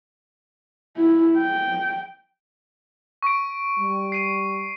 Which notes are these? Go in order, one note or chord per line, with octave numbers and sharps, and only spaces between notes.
E4
G5
C#6 D7
G3
C7 D#7